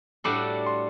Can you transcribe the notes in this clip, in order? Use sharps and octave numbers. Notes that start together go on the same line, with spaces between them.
A2 G3 D4 F#4 A4 D6
C6